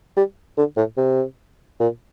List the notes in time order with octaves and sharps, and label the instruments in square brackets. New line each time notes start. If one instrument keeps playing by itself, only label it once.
[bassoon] G3
D3
A2
C3
A#2